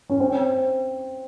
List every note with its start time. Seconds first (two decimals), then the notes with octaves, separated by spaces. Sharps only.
0.10 C#4
0.20 C4